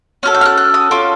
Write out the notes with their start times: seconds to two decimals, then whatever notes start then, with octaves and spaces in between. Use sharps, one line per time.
0.23 C#4 F#4 A4 F6
0.34 G6
0.41 F6
0.46 F#6
0.57 F#6
0.74 D#6
0.91 C#4 F4 A4 D6